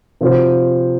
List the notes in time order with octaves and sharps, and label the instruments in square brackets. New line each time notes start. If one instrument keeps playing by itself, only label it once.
[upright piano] C3 F3 C4 F#4 C5